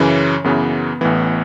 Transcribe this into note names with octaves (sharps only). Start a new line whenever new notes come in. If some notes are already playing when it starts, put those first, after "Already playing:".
Already playing: F#2 C#3 E3 C#4
F#2 C#3 E3 B3
A1 A2 E3 B3